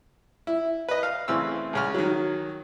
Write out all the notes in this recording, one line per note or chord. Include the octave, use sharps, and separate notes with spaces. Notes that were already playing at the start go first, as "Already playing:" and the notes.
E4
B4 D#5
F5
C#3 E3 A3 C4 F5 E6
C#2 C#3 F6
D#3 F#3